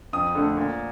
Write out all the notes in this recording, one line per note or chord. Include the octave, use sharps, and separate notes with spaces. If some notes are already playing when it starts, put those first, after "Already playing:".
F2 D#6
D3 A3
A#2